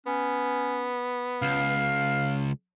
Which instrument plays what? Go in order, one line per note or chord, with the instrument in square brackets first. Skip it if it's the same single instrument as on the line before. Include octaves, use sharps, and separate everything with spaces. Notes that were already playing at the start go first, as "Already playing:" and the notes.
[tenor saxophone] B3 [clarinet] C#4
[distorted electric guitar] C#2 [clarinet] F5